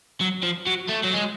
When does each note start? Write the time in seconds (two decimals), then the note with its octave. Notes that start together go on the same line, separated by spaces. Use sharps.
0.21 F#3
0.43 F3
0.66 F#3
0.88 A3
1.03 F#3
1.13 G#3